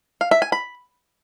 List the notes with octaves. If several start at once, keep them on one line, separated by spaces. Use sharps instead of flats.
F5
E5
G#5
B5